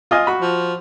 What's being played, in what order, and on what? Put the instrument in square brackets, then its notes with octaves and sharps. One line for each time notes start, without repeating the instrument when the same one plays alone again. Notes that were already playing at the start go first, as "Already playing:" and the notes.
[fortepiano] F4 D#5 G#5
F#4 B5
[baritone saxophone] F3